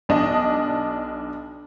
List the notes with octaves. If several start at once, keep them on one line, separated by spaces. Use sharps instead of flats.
B1 D4 D#5